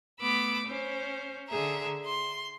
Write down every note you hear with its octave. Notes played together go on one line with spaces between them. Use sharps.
A3 B3 B5 D6 E6
C#4 C5
D3 G#4 E5 A#5
C6